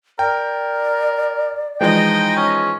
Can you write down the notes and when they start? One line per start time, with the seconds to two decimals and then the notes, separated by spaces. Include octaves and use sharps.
0.19 A#4 D5 G5
1.81 E3 F3 G#3 D#4 D#5 G5
2.37 C#4